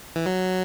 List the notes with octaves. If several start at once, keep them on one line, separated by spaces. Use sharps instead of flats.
E3
F#3